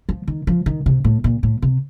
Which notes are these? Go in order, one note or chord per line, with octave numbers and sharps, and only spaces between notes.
F3
D#3
F3
D#3
C3
A2
A#2
A2
C3